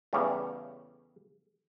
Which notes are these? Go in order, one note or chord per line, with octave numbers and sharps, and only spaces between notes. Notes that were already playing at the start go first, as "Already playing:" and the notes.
E2 C#3 G3 A3